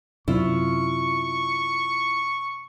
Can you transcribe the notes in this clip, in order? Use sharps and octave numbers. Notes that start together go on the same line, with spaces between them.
F#2 C3 E4 F4 C#6